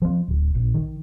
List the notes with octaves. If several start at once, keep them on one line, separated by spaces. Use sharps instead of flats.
F3 C4
D1
A#1
D#3